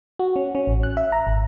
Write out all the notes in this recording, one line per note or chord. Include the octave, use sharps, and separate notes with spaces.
F#4
C#4
C#4
A1
F#6
E5
A#5
G#1